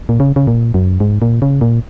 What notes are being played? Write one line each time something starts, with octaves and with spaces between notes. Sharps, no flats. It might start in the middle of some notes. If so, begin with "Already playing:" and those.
A#2
C#3
C#3
A#2
F#2
G#2
A#2
C#3
A#2